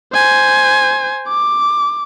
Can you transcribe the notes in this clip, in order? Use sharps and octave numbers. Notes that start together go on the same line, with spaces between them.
C5 G#5
D6